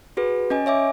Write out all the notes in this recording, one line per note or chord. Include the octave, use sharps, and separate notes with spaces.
F#4 G#4 B4
C#4 D#5 G#5
C#5 E5 G#5 D6